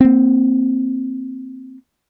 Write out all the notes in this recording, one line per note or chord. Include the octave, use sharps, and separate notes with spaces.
A#3 C4